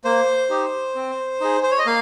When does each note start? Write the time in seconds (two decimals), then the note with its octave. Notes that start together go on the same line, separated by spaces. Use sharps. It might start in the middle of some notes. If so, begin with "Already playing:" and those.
0.05 A#3 C5
0.50 D#4 G4
0.95 C4
1.41 D#4 G#4
1.63 C5
1.71 C#5
1.79 D#5
1.86 A#3 F5